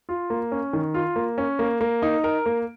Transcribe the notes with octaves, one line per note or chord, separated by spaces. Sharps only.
F4
A#3
C#4
D#3
F4
A#3
C#4
A#3
A#3
D#4
A#4
A#3